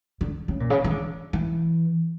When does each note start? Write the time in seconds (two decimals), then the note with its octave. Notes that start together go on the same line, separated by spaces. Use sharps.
0.21 D3
0.48 C#3
0.60 A#2
0.70 C#3
0.84 E3
0.91 D3
1.33 E3